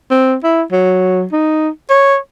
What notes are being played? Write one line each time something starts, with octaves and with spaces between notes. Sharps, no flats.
C4
E4
F#3
D#4
C#5